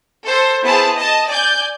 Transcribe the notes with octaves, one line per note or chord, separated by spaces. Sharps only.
A4 C5
B3 E4 G#4 C5 A5
D#5 A5
D5 G#5 G6